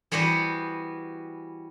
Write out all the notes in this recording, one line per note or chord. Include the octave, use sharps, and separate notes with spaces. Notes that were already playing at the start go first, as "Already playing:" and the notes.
E3 G3 B3 F#4 B4 C5